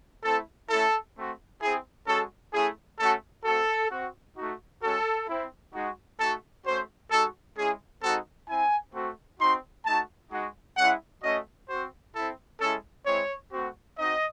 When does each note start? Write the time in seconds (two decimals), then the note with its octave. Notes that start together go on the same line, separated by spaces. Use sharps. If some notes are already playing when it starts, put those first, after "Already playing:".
0.24 A3 C4 E4 A4
0.69 A3 C#4 E4 A4
1.16 A3 C4 F#4
1.62 C4 E4 G#4
2.07 G#3 C#4 F#4 A4
2.53 A3 C#4 E4 G#4
2.99 A3 C#4 F#4 A4
3.45 A3 C4 F#4 A4
3.91 C4 F#4
4.37 A3 D#4 F#4
4.82 G#3 C#4 F#4 A4
5.28 C4 E4
5.73 G#3 D#4 F#4
6.19 A3 D#4 F#4 A4
6.65 A3 C#4 F#4 C5
7.11 G#3 D#4 F#4 A4
7.56 G#3 C#4 E4 G#4
8.02 G#3 C4 D#4 F#4 A4
8.49 C4 E4 G#5
8.94 A3 C4 F#4
9.40 C4 D#4 F#4 C6
9.86 A3 D#4 F#4 A5
10.32 G#3 D#4 F#4
10.77 G#3 C#4 E4 F#5
11.23 A3 C#4 F#4 D#5
11.69 C4 F#4 C5
12.15 C4 E4 A4
12.60 G#3 C#4 E4 A4
13.06 G#3 C4 E4 C#5
13.53 A3 C4 F#4
13.98 C4 D#4 F#4 D#5